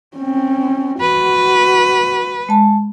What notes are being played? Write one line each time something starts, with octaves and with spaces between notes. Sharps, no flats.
C4 C#4
F#4 B4
G#3 A5